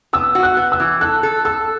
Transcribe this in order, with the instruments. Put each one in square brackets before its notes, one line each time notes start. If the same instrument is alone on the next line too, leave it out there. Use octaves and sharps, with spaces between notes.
[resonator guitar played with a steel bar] B3 [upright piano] E6
[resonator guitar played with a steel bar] F#4
[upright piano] F#6
[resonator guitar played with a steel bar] B3
[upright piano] E6
[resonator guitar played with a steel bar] E3
[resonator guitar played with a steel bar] A4 [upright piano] F#6
[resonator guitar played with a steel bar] A4
[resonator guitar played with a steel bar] A4 [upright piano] E6